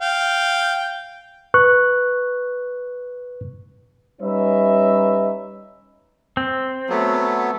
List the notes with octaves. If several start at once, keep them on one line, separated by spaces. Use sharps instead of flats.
F5 G5
B4 C#6 F#6
G3 C#4 D#4 B4 C#5 E5
C4
F#3 A3 B3